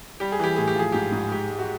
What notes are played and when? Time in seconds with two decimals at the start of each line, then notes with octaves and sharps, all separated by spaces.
0.20 G3 G4
0.32 G#4
0.39 E3 G4
0.56 A2 G#4
0.68 G4
0.75 F3 G#4
0.92 G#2 G4
1.12 G#2
1.32 G#3 G4
1.50 G#3
1.59 F#4